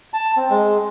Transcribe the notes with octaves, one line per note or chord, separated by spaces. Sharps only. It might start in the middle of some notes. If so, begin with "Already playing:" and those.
A5
C4
G#3